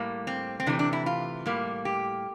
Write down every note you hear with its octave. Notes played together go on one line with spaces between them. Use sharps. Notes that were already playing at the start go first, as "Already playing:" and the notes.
Already playing: A2 G3 A#3
C4
C4
C3 E3 A3 D4
D4
E4
F4
A2 G3 A#3
G4